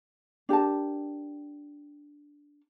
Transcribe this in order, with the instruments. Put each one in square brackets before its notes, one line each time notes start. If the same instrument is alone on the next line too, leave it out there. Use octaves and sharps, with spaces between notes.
[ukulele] D4 G4 A#4 A5